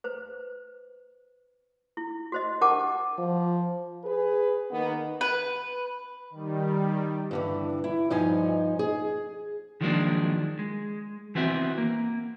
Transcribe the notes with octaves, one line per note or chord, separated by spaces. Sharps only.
B4 C5
E4
F#4 C5 D#5
D4 G4 A#4 F#5 A5 D6
F3
G#4 B4
D#3 A#3 B3
B4
D#3 G3
G2 D3 E3
E4
G2 F3 D#4 G#5
G#4
D#3 F3 F#3 G#3 A#3 D4
G#3
E3 B3 C4 F#4 E5
A#3